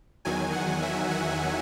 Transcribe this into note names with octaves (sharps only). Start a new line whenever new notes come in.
E2 D#3 F#3 G#5
F#5
E5
F#5